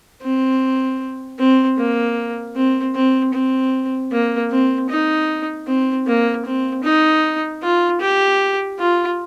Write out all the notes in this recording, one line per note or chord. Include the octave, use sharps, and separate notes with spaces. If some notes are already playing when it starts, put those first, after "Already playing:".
C4
C4
A#3
C4
C4
C4
A#3
C4
D#4
C4
A#3
C4
D#4
F4
G4
F4